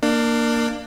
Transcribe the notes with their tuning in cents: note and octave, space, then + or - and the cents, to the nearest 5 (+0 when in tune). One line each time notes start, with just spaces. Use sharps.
A#3 +0 D4 +25